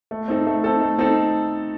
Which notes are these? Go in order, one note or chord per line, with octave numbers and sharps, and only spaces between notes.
A3
C4 D#4 A4
A3
C4 D#4 A4
A3
C4 D#4 A4